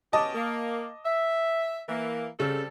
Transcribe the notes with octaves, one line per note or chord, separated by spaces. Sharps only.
B3 C#4 G4 D#5 A5 D6
A#3
E5
E3 A#3
C#3 G3 C4 A4